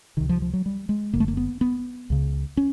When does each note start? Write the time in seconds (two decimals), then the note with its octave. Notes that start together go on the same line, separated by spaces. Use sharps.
0.17 C#2 C3 D#3
0.29 F3
0.42 F3
0.53 F#3
0.66 G3
0.89 G#3
1.13 F#1 F#2 D3 A#3
1.20 A3
1.28 A#3
1.37 B3
1.61 B3
2.10 C#2 C#3
2.57 C#4